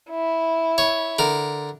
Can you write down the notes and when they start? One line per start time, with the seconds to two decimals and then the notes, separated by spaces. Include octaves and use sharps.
0.11 E4
0.78 C#5
1.19 D3 A#4